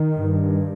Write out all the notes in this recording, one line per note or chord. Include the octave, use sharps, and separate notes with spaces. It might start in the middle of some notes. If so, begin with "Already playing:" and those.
Already playing: D#3
G2